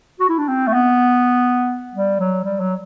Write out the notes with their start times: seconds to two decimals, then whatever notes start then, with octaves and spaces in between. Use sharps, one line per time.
0.20 F#4
0.29 E4
0.38 D4
0.48 C4
0.67 A3
0.73 B3
1.95 G3
2.20 F#3
2.44 G3
2.60 F#3